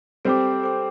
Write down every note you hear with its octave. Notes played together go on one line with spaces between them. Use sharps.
G3 C4 A4 C5 G5 D6
A4 C5 G5 D6